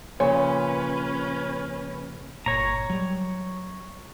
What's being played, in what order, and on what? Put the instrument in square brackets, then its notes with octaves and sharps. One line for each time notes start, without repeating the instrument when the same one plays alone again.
[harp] A#2 C#3 F3 [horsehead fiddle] C#4 B4 [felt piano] C#5
[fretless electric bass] G1 A#2 [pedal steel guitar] C#5 A#5
[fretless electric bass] F#3 G3